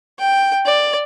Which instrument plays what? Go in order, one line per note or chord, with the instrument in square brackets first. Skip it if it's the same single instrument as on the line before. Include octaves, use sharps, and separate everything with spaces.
[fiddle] G5
D5